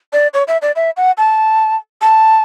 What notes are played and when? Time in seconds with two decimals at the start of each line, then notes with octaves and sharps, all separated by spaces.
0.13 D5
0.34 C#5
0.48 E5
0.62 D5
0.76 E5
0.97 F#5
1.18 A5
2.01 A5